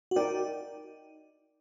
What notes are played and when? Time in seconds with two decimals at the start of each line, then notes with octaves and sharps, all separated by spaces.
0.11 F#4
0.16 D#4 A#4 D5 G5